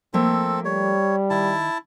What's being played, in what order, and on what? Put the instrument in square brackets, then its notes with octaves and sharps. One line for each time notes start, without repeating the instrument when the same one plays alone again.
[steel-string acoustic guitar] F3 A3 A#3 [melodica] C4 A4
[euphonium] G3 [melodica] C#5
[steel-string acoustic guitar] D#3 [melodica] E4 A5